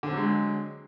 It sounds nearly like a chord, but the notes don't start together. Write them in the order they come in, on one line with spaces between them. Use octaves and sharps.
D3 C4 F#3 G#3